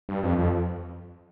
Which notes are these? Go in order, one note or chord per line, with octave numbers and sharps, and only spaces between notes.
G2
F2
F2